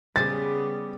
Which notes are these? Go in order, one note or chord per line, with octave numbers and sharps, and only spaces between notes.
C#3 G3 B3 G#4 C5 A6